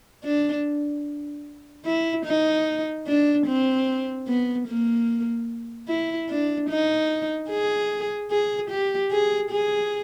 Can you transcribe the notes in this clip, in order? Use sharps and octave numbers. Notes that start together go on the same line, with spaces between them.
D4
E4
D#4
D4
C4
B3
A#3
E4
D4
D#4
G#4
G#4
G4
G#4
G#4